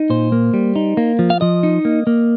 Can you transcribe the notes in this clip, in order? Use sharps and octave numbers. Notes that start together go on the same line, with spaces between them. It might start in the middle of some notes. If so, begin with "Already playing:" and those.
Already playing: D#4
A#2 C5
A#3
G3
D#4
A#3
F3
F5
F3 D#5
D#4
A#3
A#3